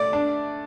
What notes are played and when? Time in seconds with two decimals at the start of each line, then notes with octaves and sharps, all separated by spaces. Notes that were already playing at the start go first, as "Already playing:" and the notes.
Already playing: A3 D5
0.13 D4